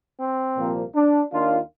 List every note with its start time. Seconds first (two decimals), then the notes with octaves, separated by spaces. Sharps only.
0.19 C4
0.57 C2 A#2 F3 A#3
0.95 D4
1.32 D#2 D#3 A#3 D4 F4